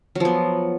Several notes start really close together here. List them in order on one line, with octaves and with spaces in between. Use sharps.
F#3 F3 B3